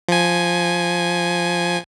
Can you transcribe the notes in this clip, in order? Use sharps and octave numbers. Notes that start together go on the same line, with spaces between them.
F3 G#5